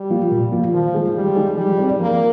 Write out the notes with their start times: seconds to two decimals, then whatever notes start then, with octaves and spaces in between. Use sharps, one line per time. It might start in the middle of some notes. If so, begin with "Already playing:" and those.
Already playing: G3
0.10 F3 A#3 F4
0.32 A#2
0.52 F3 A#3 F4
0.74 D#3 F3
0.94 G#3 D#4 G#4
1.15 D#3 G3
1.36 G#3 D#4 G#4
1.57 F3 G3
1.78 C4 D#4 G#4 D5
1.99 F3 A#3